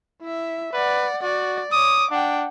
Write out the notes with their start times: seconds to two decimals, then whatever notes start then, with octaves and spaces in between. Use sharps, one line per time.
0.21 E4 E5
0.73 B4 D5 F#5
1.23 F#4 D5
1.72 C#5 D6 D#6
2.11 D4 F#5 G5